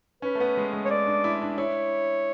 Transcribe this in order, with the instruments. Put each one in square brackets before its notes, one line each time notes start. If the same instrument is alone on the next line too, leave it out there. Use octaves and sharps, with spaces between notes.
[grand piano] C#4 [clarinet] B4
[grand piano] A3
B3
G#3
G#3
[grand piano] A3 [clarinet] C#5
[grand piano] B3 [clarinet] D5
[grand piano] D4
E4
D4
[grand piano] E4 [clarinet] C#5